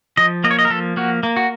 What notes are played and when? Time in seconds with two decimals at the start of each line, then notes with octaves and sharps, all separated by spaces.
0.17 F3 D#5
0.44 A#3 D#5
0.51 C#5
0.59 D#5
0.65 A#4
0.70 F3 A4
0.97 A#3 F#4
1.23 A#3
1.37 F#4